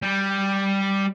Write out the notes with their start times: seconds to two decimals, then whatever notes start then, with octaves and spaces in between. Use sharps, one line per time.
0.03 G3